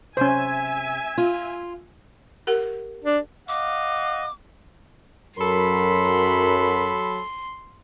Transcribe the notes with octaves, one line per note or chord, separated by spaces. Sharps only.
C3 C#4 C5 E5 G#5
F4
G4 A#4 F#5
D4
D#5 F5 F#5 D6
F#2 F#3 A4 A#4 B5 C6